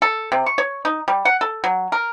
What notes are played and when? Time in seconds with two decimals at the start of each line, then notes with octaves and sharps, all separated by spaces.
0.02 A4
0.32 C3
0.46 C#6
0.58 C#5
0.85 D#4
1.08 G3
1.25 F#5
1.41 A4
1.64 F#3
1.92 A#4